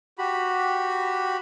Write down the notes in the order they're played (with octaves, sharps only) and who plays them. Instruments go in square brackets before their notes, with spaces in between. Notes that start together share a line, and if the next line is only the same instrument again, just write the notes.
[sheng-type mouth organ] F#4 G4 B5